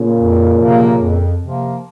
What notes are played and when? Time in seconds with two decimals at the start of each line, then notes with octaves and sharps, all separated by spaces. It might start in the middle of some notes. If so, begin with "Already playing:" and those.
Already playing: A#2 C#3
0.19 F2
0.60 C3 F3 A#3
1.01 F2
1.41 C3 F3 A#3